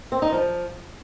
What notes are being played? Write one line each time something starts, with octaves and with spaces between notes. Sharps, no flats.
C4
D#4
F3